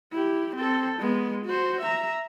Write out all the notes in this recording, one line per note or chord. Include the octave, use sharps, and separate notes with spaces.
E4 G4
C4 A4
G#3 B3
F#4 C5
E5 A#5